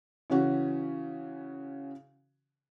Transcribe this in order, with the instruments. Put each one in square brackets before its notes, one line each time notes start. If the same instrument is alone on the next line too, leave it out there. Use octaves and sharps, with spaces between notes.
[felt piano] C#3 E3 C#4 F#4